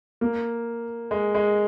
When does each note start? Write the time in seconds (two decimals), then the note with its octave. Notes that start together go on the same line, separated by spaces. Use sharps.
0.21 A#3
1.11 G#3
1.35 G#3